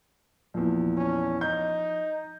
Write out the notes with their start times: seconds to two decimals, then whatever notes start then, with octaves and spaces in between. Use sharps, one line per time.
0.54 A#1 E2 F3
0.97 C#4
1.41 D#4 G6